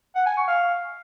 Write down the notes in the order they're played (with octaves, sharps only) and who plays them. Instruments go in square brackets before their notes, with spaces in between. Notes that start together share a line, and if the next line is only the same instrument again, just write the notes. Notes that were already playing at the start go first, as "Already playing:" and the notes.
[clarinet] F#5
G#5
C#6
F5